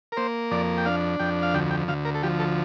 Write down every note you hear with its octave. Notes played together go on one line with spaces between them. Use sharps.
A#4
A#3 C5
F2 D5
G5
D4 F5
F2 G5
F5
D2 G5
G5
D2 F5
A#4
A4
F3 G4
A4